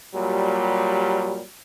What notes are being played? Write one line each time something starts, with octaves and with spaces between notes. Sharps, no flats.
A#2 F#3 G3